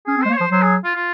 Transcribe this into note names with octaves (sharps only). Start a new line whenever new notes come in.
C#4 G#4
C4
G#3 C5
A#3
C#5
F3 C5
F#3 C5
G#4
F4
F4